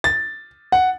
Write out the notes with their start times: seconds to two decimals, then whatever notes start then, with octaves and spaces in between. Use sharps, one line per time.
0.04 A6
0.72 F#5